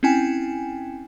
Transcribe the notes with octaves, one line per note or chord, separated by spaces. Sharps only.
C4 C#4 E4 G5 G#5